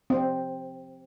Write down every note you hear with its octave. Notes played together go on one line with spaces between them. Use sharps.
C4